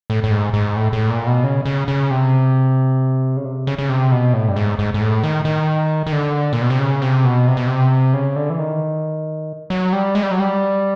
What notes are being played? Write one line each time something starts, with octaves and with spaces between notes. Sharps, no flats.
A2
A2
G#2
G#2
A2
A2
A#2
B2
C#3
C#3
C#3
C3
C#3
C3
C#3
C#3
C3
B2
A2
G2
G#2
G#2
G#2
A2
D#3
D#3
D#3
D3
A#2
B2
C3
C#3
C3
B2
C3
B2
C3
C#3
D3
E3
D#3
F#3
G3
G#3
G3
F#3
G3